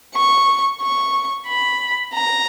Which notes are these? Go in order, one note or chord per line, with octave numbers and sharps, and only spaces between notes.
C#6
C#6
B5
A#5